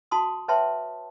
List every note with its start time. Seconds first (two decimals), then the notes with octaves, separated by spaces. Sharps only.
0.11 F#4 A5 C6 D#6
0.48 B4 C#5 E5 G5 A5 C6